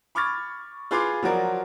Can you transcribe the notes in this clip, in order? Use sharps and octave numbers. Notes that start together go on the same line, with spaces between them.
B5 C#6 D6 F6 G#6 A6
F4 G#4 B4 F5 C6 D6
F3 F#3 F#4 A#4 D5